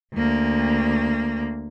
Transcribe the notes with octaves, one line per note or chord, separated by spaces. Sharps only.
D2 A#3